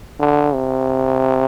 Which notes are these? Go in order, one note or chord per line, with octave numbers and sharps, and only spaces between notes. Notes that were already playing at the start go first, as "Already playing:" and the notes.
D3
C3